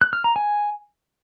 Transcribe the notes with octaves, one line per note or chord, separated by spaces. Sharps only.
F#6
F6
A#5
G#5